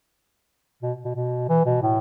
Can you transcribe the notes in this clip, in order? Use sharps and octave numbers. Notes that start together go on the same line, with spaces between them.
B2
B2
B2
E3
B2
A2